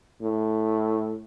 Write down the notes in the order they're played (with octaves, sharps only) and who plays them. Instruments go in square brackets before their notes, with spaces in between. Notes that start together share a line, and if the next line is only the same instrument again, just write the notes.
[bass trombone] A2